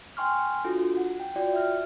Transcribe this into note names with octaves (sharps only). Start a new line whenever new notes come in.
G5 G#5 C6 C#6 F6
D4 F4 F#4 A4
F#5
G5
F4 F#4 D5 G5
E5 F6